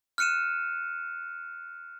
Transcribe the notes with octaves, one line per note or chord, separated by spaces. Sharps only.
F6 F#6 C#7 D#7 E7